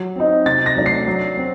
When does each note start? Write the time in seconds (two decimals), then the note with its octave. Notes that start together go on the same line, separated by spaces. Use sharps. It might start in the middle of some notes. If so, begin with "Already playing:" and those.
Already playing: F#3
0.16 C4 D#4
0.46 C3 A6
0.66 A#6
0.76 F#3 A3 D4
0.86 C7
1.07 F#3
1.37 C4